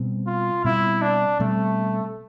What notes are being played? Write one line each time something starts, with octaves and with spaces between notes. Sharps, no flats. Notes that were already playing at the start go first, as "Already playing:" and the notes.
Already playing: B2 G3 C4
F4
B2 G3 C4 E4
D4
B2 G3 A3 C4